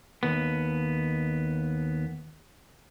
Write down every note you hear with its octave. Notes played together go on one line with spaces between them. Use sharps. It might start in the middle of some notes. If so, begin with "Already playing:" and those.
D#2 B3